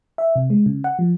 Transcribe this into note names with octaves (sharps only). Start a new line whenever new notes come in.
E5
C3
G#3
C#3
F#5
F3